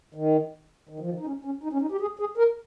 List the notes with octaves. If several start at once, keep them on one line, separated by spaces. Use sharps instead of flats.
D#3
D#3
F3
D#3
D#4
C#4
C#4
D#4
C#4
D#4
G4
G#4
G#4
A#4